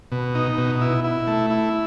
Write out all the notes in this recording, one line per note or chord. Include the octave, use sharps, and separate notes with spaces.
B2
D#4
B2
E4
E4
A3
E4